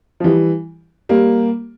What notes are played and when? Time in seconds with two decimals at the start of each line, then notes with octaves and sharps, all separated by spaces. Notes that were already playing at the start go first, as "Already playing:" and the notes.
0.20 F3
0.24 E3 G3
1.09 G3 A#3